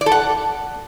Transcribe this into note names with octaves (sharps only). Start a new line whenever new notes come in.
D5
A4
F#5